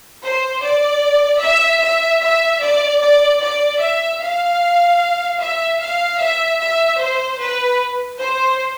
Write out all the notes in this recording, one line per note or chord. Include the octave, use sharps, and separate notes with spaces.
C5
D5
E5
E5
E5
D5
D5
D5
E5
F5
E5
F5
E5
E5
C5
B4
C5